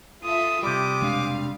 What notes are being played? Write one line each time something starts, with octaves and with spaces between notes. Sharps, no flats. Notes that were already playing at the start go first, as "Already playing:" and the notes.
F4 A4 E5 D#6
C3 G3 G4 D6 D#6
G#3 D4 F5